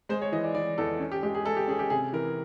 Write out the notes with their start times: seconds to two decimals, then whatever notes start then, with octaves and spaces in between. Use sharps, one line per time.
0.09 G#3 C5
0.22 C#5
0.32 E3 D#5
0.44 D5
0.55 E3 D5
0.78 E2 A4
1.00 C#4
1.12 G4
1.23 G#3 G4
1.35 G#4
1.45 G#3 A4
1.57 G4
1.68 C#4 G#4
1.79 G4
1.90 C3 G#4
2.13 E3 A#4